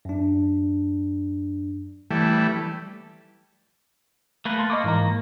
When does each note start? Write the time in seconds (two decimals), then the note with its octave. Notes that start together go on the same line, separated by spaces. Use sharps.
0.05 F#2 D4
2.11 E3 G3 A3
4.45 A3 A#3 B4
4.58 A5 C6 A6
4.70 A#3 D#5 C#6 D6
4.84 G#2 E3 A#5